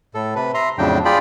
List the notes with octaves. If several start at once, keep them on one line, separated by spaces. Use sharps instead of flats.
A2 A4
C3 B4
E5 A#5 C6
F2 A2 C#3 F#3 D4 G5
F4 G#4 D5 G5 B5